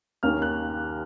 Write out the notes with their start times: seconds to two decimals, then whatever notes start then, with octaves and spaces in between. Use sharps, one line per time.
0.23 D#2 D#3 A#3 C#4 F6
0.42 F#6